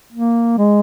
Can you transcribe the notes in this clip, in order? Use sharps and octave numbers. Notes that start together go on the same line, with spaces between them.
A#3
G#3